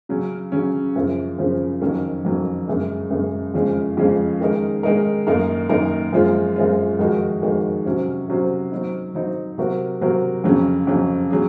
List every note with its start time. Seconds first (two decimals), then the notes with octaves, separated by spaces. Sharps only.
0.09 C#3 F#3 C#4
0.52 C#3 F#3 C#4
0.95 F#2 C#3 F3 C4
1.38 F#2 C#3 F3 C4
1.81 F2 D#3 F#3 C#4
2.25 F2 D#3 F#3 C#4
2.68 F#2 C#3 G#3
3.11 F#2 C#3 G#3
3.54 F2 C#3 F3 G#3 C#4
3.97 F2 C#3 F3 G#3 C#4
4.41 D#3 G#3 D#4 A#4
4.83 D#3 G#3 D#4 A#4
5.27 F#2 D#3 A#3 D#4 A#4
5.69 F#2 D#3 A#3 D#4 A#4
6.13 F#2 F3 G#3 C4 F4
6.56 F#2 F3 G#3 C4 F4
6.99 F2 D#3 G#3 D#4 F#4
7.42 F2 D#3 G#3 D#4 F#4
7.85 C3 F#3 C#4 F#4 C5
8.28 C3 F#3 C#4 F#4 C5
8.72 F#3 C4 D#4
9.15 F#3 C4 D#4
9.58 C3 F#3 C4 F#4 A#4
10.01 C3 F#3 C4 F#4 A#4
10.44 F2 C#3 F#3 C#4
10.87 F2 C#3 F#3 C#4
11.30 F#3 C#4 G#4